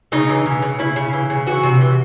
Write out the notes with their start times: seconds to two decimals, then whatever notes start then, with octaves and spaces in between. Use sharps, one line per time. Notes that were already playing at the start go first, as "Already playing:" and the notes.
0.12 C#3 D#4
0.29 E3
0.46 C#3
0.62 C#3
0.79 C#3 E4
0.96 C#3
1.13 E3
1.30 C#3
1.47 E3 F#4
1.63 C3
1.81 E3